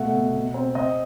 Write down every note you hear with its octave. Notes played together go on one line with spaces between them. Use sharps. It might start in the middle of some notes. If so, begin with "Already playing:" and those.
Already playing: B2 A3 F#5
B2
B2
C4
C4 D#5